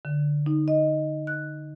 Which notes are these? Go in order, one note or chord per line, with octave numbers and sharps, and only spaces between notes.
D3
D#4
D#5
F#6